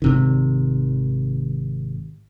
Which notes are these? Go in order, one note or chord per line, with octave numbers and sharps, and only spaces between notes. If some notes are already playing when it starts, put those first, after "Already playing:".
G#1 C3 D#3